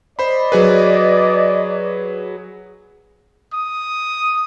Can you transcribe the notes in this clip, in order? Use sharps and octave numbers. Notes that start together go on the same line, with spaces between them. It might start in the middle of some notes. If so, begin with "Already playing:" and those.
C5 D5 D#5 B5
F#3 G#4 B4
D#6